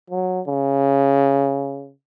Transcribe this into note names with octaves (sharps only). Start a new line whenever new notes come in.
F#3
C#3